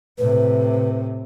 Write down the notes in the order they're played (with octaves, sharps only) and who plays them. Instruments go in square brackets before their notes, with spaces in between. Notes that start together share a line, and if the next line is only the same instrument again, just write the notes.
[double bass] A2 C3 [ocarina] B4